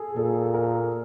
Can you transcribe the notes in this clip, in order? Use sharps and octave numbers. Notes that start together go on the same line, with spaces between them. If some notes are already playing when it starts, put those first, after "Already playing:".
Already playing: G#4 A4
A#2 A4
A#4